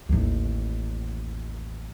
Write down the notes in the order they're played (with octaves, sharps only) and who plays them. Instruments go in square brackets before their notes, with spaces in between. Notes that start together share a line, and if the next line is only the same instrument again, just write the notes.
[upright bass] A1 D#2